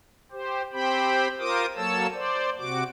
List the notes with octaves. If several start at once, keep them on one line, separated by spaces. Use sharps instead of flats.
G4 C5
C4 G4 C5 G5 B5
F4 A#4 C5 D6 D#6
F#3 A#3 A4 C#5 A5 E6
C5 D5
C3 F#4 D6